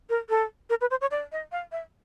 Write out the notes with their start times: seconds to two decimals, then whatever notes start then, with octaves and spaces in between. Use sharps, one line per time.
0.09 A#4
0.29 A4
0.69 A#4
0.81 B4
0.90 C5
1.01 C#5
1.11 D5
1.32 D#5
1.52 F5
1.72 E5